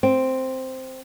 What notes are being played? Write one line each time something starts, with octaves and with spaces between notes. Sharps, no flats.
C4